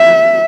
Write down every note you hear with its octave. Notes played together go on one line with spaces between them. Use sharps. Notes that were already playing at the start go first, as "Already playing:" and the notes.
Already playing: E5